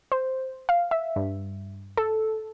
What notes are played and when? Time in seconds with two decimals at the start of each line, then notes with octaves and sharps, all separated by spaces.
0.12 C5
0.69 F5
0.91 E5
1.16 G2
1.97 A4